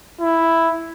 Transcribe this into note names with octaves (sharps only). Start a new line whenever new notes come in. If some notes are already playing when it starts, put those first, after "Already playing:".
E4